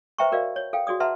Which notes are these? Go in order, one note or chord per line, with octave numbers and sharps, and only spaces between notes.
B4 C5 E5 G5 A#5 C#6
F#4 A#4 D5 D#5 F5
C#5
A4 F5 G5
F#4 G#4 D5 D#6
B4 E5 F#5 A5 A#5 C6